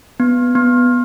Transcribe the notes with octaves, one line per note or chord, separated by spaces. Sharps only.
B3
B3